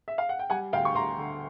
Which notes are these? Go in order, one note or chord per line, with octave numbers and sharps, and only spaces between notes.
E5
F5
F#5
G5
G3 F#5 G#5
D2 F5 G5
C#6
D2 A#5 C6
D3